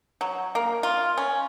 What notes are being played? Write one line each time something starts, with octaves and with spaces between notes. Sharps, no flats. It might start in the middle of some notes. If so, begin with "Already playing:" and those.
F#3
A#3
F4
C#4